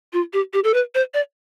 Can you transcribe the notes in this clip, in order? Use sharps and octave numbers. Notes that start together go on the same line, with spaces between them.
F4
G4
G4
A4
B4
C5
D5